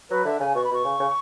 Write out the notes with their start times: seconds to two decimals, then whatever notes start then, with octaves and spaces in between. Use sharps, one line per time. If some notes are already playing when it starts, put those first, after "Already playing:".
0.10 F#3 B4
0.25 D3 E5
0.40 C#3 G#5
0.55 B2 C#6
0.64 B5
0.70 B2 C#6
0.84 C#3
1.00 C#3